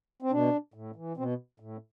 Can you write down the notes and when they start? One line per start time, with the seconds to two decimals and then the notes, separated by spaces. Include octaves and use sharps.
0.22 C4
0.31 B2 D4
0.74 A2
0.96 E3
1.17 B2 C4
1.60 A2